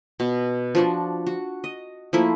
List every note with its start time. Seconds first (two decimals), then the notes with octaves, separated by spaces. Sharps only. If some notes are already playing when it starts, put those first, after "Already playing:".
0.20 B2
0.75 F3 D4 F#4
1.27 F#4
1.64 D#5
2.13 F3 A3 A#3 E4